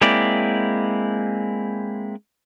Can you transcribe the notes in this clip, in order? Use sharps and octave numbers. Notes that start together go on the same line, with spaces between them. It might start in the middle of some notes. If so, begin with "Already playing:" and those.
G#3 A#3 C4 E4 D5